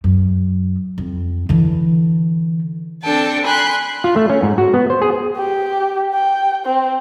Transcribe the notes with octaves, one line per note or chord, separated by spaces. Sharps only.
F#2
F2
D3 E3
C4 D4 A4 G5 A5
G#5 B5 C6 F#6 G6
F4
A3
C#4
G#2
F#4
B3
C5
G#4
G4
G5
C4